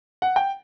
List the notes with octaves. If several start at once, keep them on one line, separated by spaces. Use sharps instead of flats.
F#5
G5